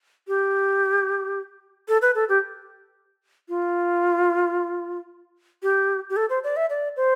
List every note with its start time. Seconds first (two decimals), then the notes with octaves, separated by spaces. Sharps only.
0.28 G4
1.88 A4
2.02 B4
2.15 A4
2.29 G4
3.49 F4
5.63 G4
6.10 G4
6.16 A4
6.30 C5
6.44 D5
6.57 E5
6.70 D5
6.97 C5